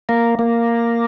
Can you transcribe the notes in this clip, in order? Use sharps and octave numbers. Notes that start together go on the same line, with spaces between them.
A#3
A#3